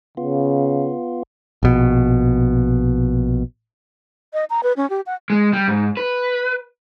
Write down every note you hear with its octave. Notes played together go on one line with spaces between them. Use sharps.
C#3 B3 F4
A#1 B2
D#5
A#5
B4
C#4
G4
F#5
G#3
G3
G#2
B4